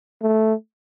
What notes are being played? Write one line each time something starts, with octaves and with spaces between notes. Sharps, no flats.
A3